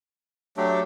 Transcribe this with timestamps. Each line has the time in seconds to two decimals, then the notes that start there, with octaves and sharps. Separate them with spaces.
0.57 F#3 A3 D4 G4